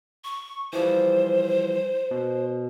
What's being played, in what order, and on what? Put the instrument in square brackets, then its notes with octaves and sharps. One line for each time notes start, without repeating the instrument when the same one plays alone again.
[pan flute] C#6
[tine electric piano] E3 F3 G3 [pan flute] C5
[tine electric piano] B2